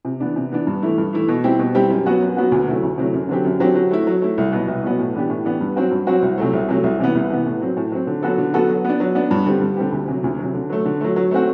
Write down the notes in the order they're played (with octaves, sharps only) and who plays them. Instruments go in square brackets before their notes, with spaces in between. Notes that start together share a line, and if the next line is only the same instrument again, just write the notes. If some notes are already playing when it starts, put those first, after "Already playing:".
[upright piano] C3
E3 B3 D4
C3
E3 B3 D4
G2
E3 A3 E4
G2
E3 A3 E4
B2
G3 C4 E4 G4
B2
G3 C4 E4 G4
F#2
F#3 B3 F#4
F#2
F#3 B3 F#4
D2
C3 F#3 A3 E4
D2
C3 F#3 A3 E4
F#2
D3 F#3 C4 G4
F#2
D3 F#3 C4 G4
F#3
A3 E4
F#3
A3 E4
C2
B2 F#3 B3
C2
B2 F#3 B3
A2
E3 B3 D4 G4
A2
E3 B3 D4 G4
G2
F#3 C4 F#4
G2
F#3 C4 F#4
C2
C3 F#3 A3
C2
C3 F#3 A3
C2
C3 E3 B3
C2
C3 E3 B3
A2
F#3 C4
A2
F#3 C4
D3
F#3 B3 F#4 A4
D3
F#3 B3 F#4 A4
F#3
B3 D4
F#3
B3 D4
G2
D3 G3 C4 G4
G2
D3 G3 C4 G4
D2
C3 F#3
D2
C3 F#3
D3
F#3 A3
D3
F#3 A3
F#3
A3 C4 F#4